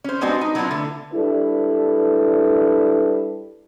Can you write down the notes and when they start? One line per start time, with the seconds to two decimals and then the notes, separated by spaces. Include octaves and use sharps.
0.04 C#4 C5
0.21 G3 G#3 B3 C4 D4 F#4
0.41 D#4
0.55 F#3 A3 B3 D4 E4 F4
0.71 D3 A3
1.13 G3 D4 E4 A4 B4